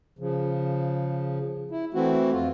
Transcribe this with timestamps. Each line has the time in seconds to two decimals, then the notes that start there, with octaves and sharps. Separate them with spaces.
0.19 C#3 F3
1.71 E4
1.94 E3 A3 C4 E4 F#4
2.31 F2 F4